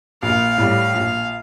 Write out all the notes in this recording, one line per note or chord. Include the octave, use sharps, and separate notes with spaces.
A#1 F5
A2 G3
A#1